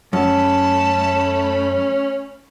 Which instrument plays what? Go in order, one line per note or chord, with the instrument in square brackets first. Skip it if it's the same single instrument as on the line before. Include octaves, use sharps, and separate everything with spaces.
[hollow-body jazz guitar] F#2 [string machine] A3 B5 [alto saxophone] C#4 [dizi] A5